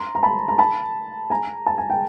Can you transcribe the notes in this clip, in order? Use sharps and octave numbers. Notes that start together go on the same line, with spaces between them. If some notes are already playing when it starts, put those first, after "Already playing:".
Already playing: A#5 C6
A#5
A5 B5
A#5
A5 B5
G#5 A#5
A5
G#5
G5